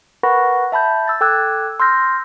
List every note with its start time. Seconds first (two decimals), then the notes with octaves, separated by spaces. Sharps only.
0.23 A#4 B4 F#5 B5 C#6 A#6
0.72 E5 A5 B5 G6
1.08 E6 A6
1.21 A4 G5 D6 E6 F#6 G#6
1.80 C6 E6 F6 G6 A#6